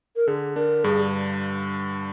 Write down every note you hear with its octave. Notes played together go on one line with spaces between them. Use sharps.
A#4
D3 G#4
D4 A#4
G2 G#4